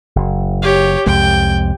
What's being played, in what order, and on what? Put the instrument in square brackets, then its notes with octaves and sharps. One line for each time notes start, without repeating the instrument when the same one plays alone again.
[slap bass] F#1
[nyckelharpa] G4 C#5
[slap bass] C2 F2 G#3 [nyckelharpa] G5